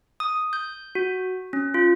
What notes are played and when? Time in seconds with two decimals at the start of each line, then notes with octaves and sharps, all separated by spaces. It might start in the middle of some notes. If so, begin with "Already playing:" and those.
0.20 D#6
0.53 G6
0.95 F#4
1.53 C#4
1.74 F4